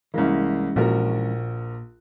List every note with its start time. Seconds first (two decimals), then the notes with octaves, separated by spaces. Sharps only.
0.14 C2 E3 G#3 A#3 C#4
0.76 A#1 A#2 F#4 A#4